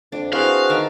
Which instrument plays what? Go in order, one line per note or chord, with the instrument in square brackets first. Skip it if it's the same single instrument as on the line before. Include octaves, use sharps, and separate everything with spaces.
[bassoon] F2 [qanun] D4
[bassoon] C4 [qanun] E4 [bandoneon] F#4 G#4 B4 [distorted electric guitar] F5
[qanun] D#3 E5 A5